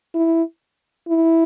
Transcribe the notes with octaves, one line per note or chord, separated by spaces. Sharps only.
E4
E4